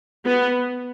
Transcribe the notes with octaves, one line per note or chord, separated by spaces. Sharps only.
B3